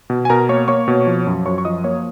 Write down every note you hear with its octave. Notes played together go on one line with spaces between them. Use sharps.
B2
G#5
B2 A#4 A#5
A#3 C#5 C#6
A#3 C#5 C#6
B2
F3
F#2
F#2 C#5 C#6
C#6
F3 D#5 D#6
A#3 C#5 C#6